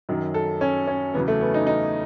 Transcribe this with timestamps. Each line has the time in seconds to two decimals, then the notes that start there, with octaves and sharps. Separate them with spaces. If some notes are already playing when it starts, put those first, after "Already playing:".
0.09 F#2 D#3 F#3
0.34 A4
0.61 C#4
0.87 C#4
1.14 E2 C#3 F#3 B3
1.28 A3
1.41 B3
1.54 D#4
1.67 D#4